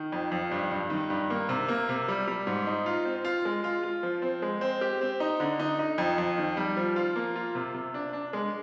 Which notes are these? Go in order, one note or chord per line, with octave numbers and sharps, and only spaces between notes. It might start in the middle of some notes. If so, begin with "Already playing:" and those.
Already playing: D#3
F2
F2
G2
G2
D#3
G2
A#3
C3
A#3
C3
G3
G3
G#2
D#4
F4
C4
F4
G#3
F4
F4
F3
C4
G#3
C4
G4
C4
D#4
D3
D#4
D#4
F2
F2
D#3
G3
F3
F4
A#3
F4
C3
C3
D4
D4
G#3